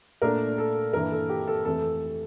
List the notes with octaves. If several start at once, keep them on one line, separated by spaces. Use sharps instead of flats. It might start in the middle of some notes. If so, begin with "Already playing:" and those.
A#2 A3 D4 A#4
A4
G2 E3 A#3 E4 A#4
A4
G4
A4
F2 E3 A3 A4